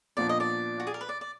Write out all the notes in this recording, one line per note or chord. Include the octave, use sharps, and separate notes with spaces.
A#2 F3 B3 D4 D5
D#5
D5
F#4
G#4
A#4
B4
D5
D5